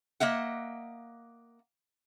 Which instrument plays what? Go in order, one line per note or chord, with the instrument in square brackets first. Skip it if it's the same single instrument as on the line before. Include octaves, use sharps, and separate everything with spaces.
[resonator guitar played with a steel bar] A#3 D#5 E5 F#5